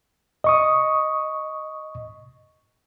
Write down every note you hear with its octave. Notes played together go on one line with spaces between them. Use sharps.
D#5 C#6 D#6